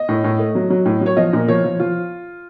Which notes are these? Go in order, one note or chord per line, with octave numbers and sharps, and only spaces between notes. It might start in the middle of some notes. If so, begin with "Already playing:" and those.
Already playing: D#5
A2
A2
A3
F#3
F#3
A2
F#3
C#5
F3 D#5
A#2
F3 C#5
F3
F3 F4